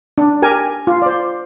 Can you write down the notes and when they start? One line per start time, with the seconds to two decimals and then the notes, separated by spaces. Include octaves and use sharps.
0.18 D4
0.42 G4 A#4 G#5
0.87 F4
1.02 C5 D5